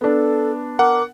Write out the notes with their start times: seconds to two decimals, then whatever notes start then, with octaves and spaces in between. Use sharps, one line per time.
0.01 B3 D4 A4
0.79 A#4 F#5 D6